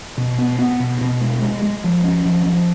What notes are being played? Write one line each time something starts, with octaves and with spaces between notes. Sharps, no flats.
B2
B3
B3
B2
B2
G#3
G#3
G#3
F3
C#4
F3
F3